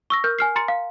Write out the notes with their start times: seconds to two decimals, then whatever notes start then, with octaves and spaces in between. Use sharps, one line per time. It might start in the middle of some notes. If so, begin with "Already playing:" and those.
0.10 C#6 E6 A#6
0.24 A#4 F6 G6
0.39 G#5 F6 C7
0.56 A#5 C6 A6 C#7
0.68 F5